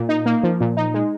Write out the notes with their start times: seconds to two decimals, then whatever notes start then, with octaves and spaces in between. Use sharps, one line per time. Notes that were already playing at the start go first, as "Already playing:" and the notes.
Already playing: A#2
0.09 D#4
0.26 A#3
0.43 F3
0.61 A#2
0.77 D#4
0.94 G#3